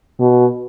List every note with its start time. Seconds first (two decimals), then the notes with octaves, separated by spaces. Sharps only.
0.20 B2